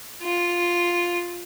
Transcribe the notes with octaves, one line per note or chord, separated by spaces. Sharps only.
F4